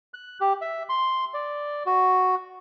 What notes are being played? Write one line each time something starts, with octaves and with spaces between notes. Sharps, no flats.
F#6
G4
E5
C6
D5
F#4